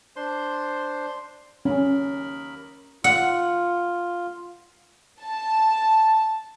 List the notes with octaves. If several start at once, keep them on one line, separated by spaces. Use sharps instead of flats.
D4 C5 C6
D#2 C#4 A#4 B5
F4 F#5
A5